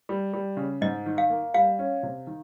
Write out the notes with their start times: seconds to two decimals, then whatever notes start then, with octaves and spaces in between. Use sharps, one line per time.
0.09 G3
0.33 G3
0.57 C#3
0.81 G#2 D#5
1.06 D#3
1.18 F5
1.30 A#3
1.54 G3 F5
1.79 C#4
2.03 C3
2.27 D#3